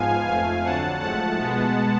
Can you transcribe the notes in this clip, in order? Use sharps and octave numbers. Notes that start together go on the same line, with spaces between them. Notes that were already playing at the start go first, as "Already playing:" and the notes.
Already playing: G#2 F3 B3 F5 G#5
F2 F3 A3 F5 G#5
F2 D3 F#3 F#5 A5
G#2 F3 A3 F#5 A5
B2 G#3 B3